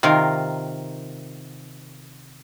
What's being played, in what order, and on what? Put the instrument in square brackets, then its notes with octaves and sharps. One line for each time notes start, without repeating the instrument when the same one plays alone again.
[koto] C3 D#3 F4 A#4